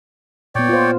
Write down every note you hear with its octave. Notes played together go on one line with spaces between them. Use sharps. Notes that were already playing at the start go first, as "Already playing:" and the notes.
A#2 B3 C#5 D5 G5
F4 C5